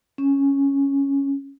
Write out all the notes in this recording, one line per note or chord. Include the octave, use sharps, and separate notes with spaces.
C#4